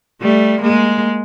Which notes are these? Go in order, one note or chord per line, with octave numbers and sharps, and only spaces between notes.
G3 A3
G#3 A#3